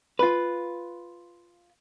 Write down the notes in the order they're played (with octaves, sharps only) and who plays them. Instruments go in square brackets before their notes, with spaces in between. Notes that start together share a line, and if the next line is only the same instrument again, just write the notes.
[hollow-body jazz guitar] F4 B4